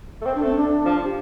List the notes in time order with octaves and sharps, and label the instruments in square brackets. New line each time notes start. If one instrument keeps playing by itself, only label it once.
[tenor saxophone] A3
[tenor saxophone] C4 [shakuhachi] C5
[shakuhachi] D4
[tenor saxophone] A3
[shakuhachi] C4
D4
[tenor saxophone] F3
[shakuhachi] G4